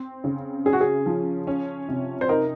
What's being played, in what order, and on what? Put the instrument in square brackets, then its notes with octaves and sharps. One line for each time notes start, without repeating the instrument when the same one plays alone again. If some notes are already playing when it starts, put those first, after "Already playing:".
Already playing: [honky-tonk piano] C4
C#3
[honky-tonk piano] C#4 [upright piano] G#4
[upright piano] F#4
G#4
[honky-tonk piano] F3
C#4
C3
[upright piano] C5
[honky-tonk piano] D#4 [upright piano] A#4